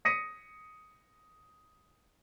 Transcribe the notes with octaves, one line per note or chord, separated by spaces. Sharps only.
D#6 A#6 B6 C#7 D#7